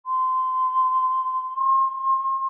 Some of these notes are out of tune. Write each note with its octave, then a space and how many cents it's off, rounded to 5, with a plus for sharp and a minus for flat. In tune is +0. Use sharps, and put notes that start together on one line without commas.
C6 -20
C6 +35